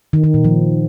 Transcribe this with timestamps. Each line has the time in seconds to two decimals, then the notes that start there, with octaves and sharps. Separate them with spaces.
0.13 D#3
0.24 D#3
0.34 A#2
0.44 F3